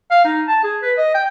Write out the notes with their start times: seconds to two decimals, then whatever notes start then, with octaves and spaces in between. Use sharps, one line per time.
0.11 F5
0.25 D#4
0.48 A5
0.64 G#4
0.82 B4
0.97 D#5
1.14 G5